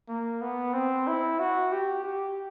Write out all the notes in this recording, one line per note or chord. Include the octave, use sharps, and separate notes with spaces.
A#3
B3
C4
E4
F#4
G4
G4